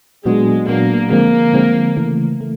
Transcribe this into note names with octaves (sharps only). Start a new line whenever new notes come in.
A#2 F#3 G#3 B3 D4 F#4
A#2 F#3 A#3 B3 D4 F#4
D3 F3 G#3 A#3 C4
D3 F3 G#3 C4
C#3 E3 A3
A3